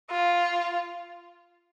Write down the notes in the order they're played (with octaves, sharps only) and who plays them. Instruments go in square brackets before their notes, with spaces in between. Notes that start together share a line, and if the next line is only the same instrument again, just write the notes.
[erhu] F4